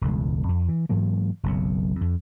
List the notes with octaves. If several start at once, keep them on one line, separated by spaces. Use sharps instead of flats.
E1 C#2 G2
F2
E3
G#2 E3 F#3 A#3
F#1 B1 F#3
F2